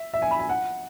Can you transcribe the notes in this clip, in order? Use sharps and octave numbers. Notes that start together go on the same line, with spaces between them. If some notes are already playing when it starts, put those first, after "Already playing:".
Already playing: E5
E5
G#5
B5
G#5
F#5